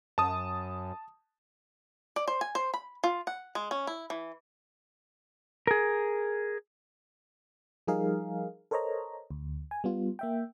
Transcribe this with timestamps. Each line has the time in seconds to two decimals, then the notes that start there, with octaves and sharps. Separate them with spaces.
0.18 F#2 A5 D#6
2.16 D5
2.28 C5
2.41 G#5
2.55 C5
2.74 B5
3.04 F4
3.27 F#5
3.55 G#3
3.71 C#4
3.87 E4
4.10 E3
5.67 G#4 A#4
7.87 F3 G3 D#4 G#4 A#4 F5
8.71 A4 A#4 C5 C#5 D#5 A#5
9.31 D2
9.71 G#5
9.84 G3 B3 F4
10.19 A#3 E5 G5